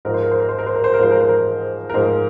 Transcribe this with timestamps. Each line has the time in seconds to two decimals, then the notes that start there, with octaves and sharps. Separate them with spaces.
0.05 G#2 F3 G#3 A#4
0.14 C5
0.23 A#4
0.31 C5
0.40 A#4
0.49 C5
0.59 A#4
0.66 C5
0.76 A#4
0.84 C5
0.94 A#4
0.99 G#2 F3 G#3 C5
1.11 A#4
1.20 C5
1.29 A#4
1.90 A#4
1.94 G#2 F3 G#3 C5